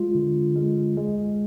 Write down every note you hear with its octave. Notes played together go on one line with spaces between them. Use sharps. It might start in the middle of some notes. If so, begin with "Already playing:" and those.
Already playing: G#3 F4
D3
G#3
G#3